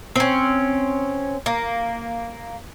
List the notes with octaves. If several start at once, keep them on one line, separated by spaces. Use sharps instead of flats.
C4 C#4
A#3